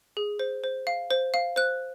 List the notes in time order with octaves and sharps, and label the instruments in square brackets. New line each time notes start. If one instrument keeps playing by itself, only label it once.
[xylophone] G#4
C5
C5
F5
C5
F5
C5 F#6